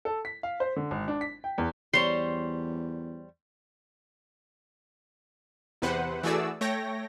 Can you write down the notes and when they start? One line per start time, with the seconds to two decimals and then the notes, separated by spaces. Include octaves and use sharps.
0.05 A4
0.25 B6
0.43 F5
0.60 C5
0.76 D3
0.91 G#1
1.08 D4
1.21 B6
1.44 G5
1.58 E2
1.94 E2 G3 C5 C#5 C6
5.82 E2 C3 B4 C5 F#5
6.23 E3 A3 F#4 G#4 D5 E6
6.61 A3 C#5 G5 A#6